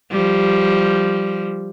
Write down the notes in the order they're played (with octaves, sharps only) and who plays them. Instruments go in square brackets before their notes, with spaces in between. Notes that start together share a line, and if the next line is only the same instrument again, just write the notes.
[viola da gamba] F3 G3